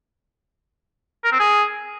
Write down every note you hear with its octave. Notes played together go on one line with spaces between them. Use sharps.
A#4
C4
G#4